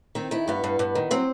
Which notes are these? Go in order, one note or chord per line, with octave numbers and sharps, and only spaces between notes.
D#3 C4
D#3 E4
G2 B3
G2
G2
D#3
F#3 C4